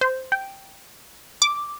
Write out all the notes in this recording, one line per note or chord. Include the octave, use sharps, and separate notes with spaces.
C5
G5
D6